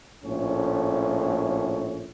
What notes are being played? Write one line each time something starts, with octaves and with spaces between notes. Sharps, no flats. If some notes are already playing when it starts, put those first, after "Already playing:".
A#1 A2 A3 C#4